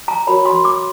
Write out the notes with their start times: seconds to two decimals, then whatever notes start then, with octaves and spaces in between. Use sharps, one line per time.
0.08 A#5
0.27 F#4 A#4 C#5 B5
0.46 C6
0.65 D6